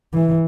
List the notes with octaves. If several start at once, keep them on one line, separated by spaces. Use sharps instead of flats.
E3